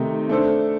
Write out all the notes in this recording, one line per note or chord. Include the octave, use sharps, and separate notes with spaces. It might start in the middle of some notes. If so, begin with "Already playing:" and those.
Already playing: C3 D#3 A3 D#4 G4
A3 D4 A4 C5